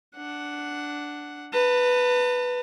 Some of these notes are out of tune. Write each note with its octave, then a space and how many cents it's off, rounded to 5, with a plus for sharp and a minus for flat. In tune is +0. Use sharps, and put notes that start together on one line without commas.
D4 -5 F#5 +0
B4 +0 A5 +45